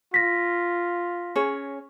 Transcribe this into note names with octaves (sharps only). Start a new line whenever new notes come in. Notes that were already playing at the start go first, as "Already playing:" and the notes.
F4 A#6 B6
C#4 G#4 C#5